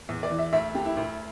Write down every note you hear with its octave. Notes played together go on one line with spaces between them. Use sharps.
E2
D5
E3
E5
D2 E5
D3 G4
E4
D2 E4